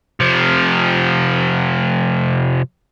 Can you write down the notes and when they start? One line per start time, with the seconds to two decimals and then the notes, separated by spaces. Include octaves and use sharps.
0.20 C3 F3